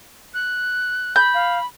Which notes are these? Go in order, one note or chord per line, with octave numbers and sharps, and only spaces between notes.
F#6
B5 G6
F5